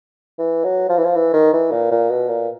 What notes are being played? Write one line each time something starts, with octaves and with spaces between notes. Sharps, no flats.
E3
F#3
F3
E3
F3
E3
D#3
E3
A#2
A#2
B2
A#2